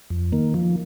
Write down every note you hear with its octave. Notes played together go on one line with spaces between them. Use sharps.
F2
D#3 A#3
F3